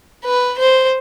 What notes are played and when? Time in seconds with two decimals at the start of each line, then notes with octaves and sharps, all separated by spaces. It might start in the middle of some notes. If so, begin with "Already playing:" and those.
0.25 B4
0.58 C5